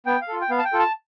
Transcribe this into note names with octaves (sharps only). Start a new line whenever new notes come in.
B3 G5
F5
F4 A4
G5
B3 F5
A5
G5
F4 A4
A5